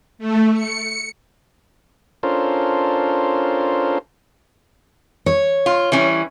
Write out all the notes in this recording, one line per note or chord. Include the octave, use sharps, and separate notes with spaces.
A3
C#7
C#4 D4 F4 A4 A#4 C5
C#5
F4
E3 G3 C#4